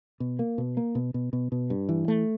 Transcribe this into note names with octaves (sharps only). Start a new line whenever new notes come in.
B2
A#3
B2
A#3
B2
B2
B2
B2
G2
E3
A3